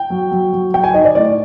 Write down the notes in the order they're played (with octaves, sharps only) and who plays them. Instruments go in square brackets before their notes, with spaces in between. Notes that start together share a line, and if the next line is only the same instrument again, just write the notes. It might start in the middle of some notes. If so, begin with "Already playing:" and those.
Already playing: [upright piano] G5
F#3
F#3
F#3
F#3 G5
G#5
D#4 D#5
D5
A2 D5